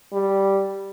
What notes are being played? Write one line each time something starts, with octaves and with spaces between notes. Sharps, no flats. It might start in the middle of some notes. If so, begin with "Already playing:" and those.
G3